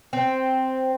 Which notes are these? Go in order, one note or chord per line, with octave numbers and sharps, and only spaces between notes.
C4